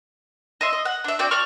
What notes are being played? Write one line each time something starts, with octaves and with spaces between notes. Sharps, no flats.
D#5 E5 C6
D#5
F#5
D4 E5
C4 F#4 D5 G5
D5 A5 C#6 F6